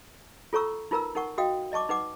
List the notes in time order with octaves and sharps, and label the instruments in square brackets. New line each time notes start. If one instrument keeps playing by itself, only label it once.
[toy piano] F4 A4 C#5 A#5 C#6 E6
D#4 F4 A#4 B4 A#5 E6
D#4 A#4 F#5 C#6
F#4 D#5 F5 G5 D#6
D5 D#5 A5 C#6 D6
D#4 B4 F#5 D6